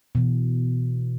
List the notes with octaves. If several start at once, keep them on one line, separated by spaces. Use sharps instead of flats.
B2 E3